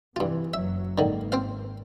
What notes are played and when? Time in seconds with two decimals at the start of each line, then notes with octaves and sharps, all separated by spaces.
0.16 G2 C3 E3 F4
0.54 F#1 F#3 E5
0.98 G#1 D3 D#3 A#3
1.32 C4 C5 F5